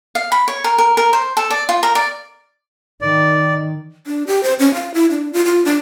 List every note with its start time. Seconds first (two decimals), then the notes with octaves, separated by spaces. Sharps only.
0.15 F5
0.32 B5
0.48 C#5
0.64 A#4
0.78 A#4
0.97 A#4
1.13 C5
1.37 A4
1.50 D5
1.69 F4
1.83 A#4
1.95 D5
3.01 D#3 D5
4.06 D4
4.27 G4
4.43 C5
4.59 C#4
4.74 F5
4.94 E4
5.11 D4
5.33 F4
5.45 F4
5.65 D4